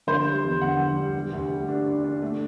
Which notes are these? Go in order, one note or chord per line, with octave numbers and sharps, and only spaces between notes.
D3 C5
G3
E2
D3 F#5
D3
G3
G3
D2
G3
D4
D4
D4
A3